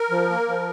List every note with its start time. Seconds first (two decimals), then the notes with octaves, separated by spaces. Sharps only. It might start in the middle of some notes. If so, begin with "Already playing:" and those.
Already playing: A#4
0.11 F3
0.30 A#3
0.48 F3